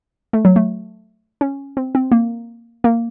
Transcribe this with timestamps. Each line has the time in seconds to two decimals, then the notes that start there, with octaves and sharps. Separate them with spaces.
0.33 A3
0.45 F#3
0.56 A3
1.41 C#4
1.77 C4
1.95 C4
2.12 A#3
2.84 A#3